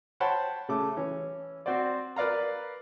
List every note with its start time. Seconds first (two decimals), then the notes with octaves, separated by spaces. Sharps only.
0.20 C5 C#5 F#5 G5 A5 B5
0.69 C#3 A3 D6
0.97 E3 C#4
1.66 C4 F#4 C5 D5
2.16 A#4 B4 D5 F5 A#5